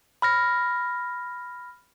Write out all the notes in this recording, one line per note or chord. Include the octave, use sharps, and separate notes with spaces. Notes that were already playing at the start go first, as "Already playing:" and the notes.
B5 F6 A#6